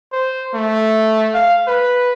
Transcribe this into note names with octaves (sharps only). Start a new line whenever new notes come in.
C5
A3
F5
B4